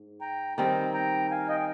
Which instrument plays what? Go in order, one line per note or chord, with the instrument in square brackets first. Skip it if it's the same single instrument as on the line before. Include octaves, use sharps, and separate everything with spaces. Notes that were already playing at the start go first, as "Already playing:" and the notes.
Already playing: [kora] G#2
[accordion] G5 A#5
[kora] D#3 G3 C4 [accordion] G5 A#5
[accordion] G5 A#5
F5 G#5
D#5 G5